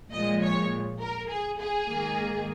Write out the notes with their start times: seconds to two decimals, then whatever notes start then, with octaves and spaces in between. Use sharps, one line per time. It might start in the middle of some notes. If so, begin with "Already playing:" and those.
0.11 A#2 F3 G#3 D#5
0.42 C#5
1.00 A#4
1.29 G#4
1.59 G#4
1.88 G#2 D#3 A#3